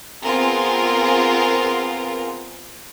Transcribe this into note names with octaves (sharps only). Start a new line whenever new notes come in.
B3 C4 F4 G#4 A#4